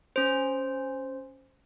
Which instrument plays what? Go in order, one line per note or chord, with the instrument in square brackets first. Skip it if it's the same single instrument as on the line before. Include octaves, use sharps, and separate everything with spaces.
[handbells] C#4 C5